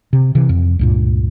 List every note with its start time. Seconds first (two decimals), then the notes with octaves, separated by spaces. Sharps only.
0.13 C3
0.35 C3 E3
0.49 F2
0.79 C#2 G2 A#2